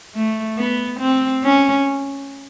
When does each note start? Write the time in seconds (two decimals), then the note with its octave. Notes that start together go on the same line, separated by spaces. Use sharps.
0.15 A3
0.58 B3
1.00 C4
1.44 C#4